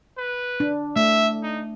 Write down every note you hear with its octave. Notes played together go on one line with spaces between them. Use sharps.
B4
D4
A3 E5
D#4